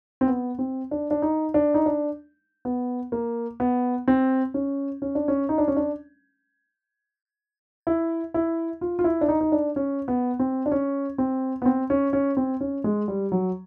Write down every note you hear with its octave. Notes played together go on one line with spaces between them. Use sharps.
C4
B3
C4
D4
D4
D#4
D4
D#4
D4
B3
A#3
B3
C4
C#4
C#4
D4
C#4
D#4
D4
C#4
D4
E4
E4
F4
F4
E4
D4
D#4
D#4
D4
C#4
B3
C4
D4
C#4
C4
B3
C4
C#4
C#4
C4
C#4
G#3
G3
F#3